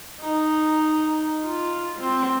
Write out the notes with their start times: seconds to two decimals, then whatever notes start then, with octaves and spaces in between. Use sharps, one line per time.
0.21 D#4
1.44 F4
1.99 C4